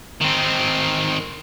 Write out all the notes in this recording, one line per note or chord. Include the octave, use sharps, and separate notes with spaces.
D#3 C4